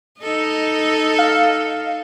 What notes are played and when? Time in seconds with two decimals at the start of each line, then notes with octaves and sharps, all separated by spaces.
0.21 D#4 A4 D#5
1.19 F5